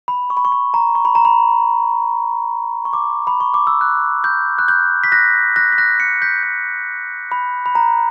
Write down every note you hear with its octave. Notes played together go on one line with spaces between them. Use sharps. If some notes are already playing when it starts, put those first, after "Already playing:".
B5
C#6
B5
C#6
B5
A#5
C#6
B5
A#5
B5
C#6
D6
B5
C#6
D6
E6
F#6
G6
F#6
G6
B6
F#6 A#6
F#6 A#6
B6
F#6 A#6
A#6 C#7
G6 B6
G6
B5
B5
A#5